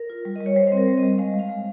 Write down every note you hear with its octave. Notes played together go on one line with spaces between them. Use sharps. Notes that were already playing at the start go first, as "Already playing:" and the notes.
Already playing: A#4
F4
G3
G3 D#5
C#5
G3 C5
C5
C4
A#4
G3
D#5
G3
G#3 F5
G#3
F5
G#3